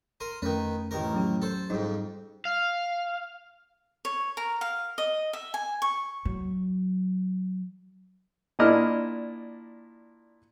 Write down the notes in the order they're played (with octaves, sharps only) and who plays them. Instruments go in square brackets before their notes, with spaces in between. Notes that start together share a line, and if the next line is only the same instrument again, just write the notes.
[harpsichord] A#4 C6 [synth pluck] D#7
[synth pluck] F2 A3 C#4 [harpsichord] D#3 B4
[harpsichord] A1 D#3 A#4
[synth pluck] F#3 C#4 G4
[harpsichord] A4 C5
[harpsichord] F2 G#2 [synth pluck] G3 D#4
[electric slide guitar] F5
[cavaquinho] C#5
A#4
F5
D#5
E5
G#5
C#6
[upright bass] F#3
[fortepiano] A#2 D4 E4 D#5 F6